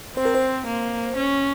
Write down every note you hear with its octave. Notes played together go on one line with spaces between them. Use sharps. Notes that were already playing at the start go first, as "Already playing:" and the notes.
C4 C5
A#4
C5
A#3
C#4